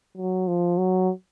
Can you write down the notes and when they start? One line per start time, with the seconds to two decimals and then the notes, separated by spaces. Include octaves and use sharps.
0.17 F#3
0.48 F3
0.78 F#3